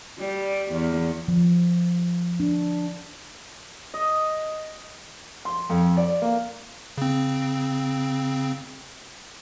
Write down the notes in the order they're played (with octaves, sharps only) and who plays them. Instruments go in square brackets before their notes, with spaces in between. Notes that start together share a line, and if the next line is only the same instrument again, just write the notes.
[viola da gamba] G3
E2
[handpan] F3
D4
[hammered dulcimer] D#5
[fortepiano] C6
F2
D5
A#3
[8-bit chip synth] C#3 C4